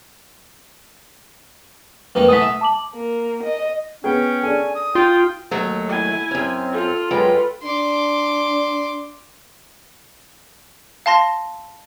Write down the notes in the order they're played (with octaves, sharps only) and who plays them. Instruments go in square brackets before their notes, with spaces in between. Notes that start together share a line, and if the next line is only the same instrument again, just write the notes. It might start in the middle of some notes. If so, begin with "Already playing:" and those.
[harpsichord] F2 D#3 A#3 [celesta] B4
[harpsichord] E3 A3 B3 [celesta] D#6 B6
[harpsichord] E5
[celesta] A5 D6 F#7
[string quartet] A#3
D#5
[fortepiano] B3 G#4 [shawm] C#4 [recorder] G5
[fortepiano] D4 G#4 A4 [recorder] G#5
[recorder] D#6
[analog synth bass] F4 [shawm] G5
[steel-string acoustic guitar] D#2 F#3 A3
[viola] E4 G#5
[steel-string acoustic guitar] F#2 C#4 [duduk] C4
[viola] F4 A4
[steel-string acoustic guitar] F#2 G#3 G5 [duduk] B4
[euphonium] D4 [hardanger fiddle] C6 D6
[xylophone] F5 A5 C6 A#6